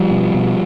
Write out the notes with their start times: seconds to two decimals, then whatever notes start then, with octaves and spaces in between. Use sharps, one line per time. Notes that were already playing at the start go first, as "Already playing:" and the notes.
Already playing: F3 G3
0.11 B2
0.34 B2